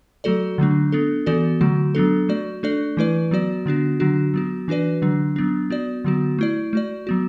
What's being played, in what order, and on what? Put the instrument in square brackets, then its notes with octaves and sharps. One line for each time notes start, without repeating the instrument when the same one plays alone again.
[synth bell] F#3 A3 F#4 A4 D5
D3 F#3 A3 D4
B3 D4 A4
E3 B3 F#4 A4 D5
D3 F#3 A3 F#4
F#3 B3 D4 A4
A3 F#4 D5
A3 D4 A4 D5
E3 A3 E4 B4 D5
F#3 B3 F#4 D5
D3 B3 D4 F#4
D3 F#3 D4 F#4
F#3 B3 F#4
E3 D4 F#4 B4 D5
D3 F#3 D4
F#3 B3 D4
B3 F#4 D5
D3 F#3 B3 F#4
A3 E4 D5
A3 F#4 D5
F#3 B3 F#4